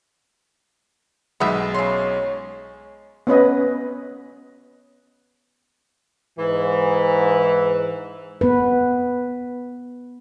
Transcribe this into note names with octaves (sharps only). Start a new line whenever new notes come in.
B1 G#3 B3 E5
C#3 C#5 C6
B3 C#4 B4 D#5
G#2 E3
B3 B4